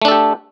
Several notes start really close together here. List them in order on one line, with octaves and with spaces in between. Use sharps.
A3 D4 A4 G4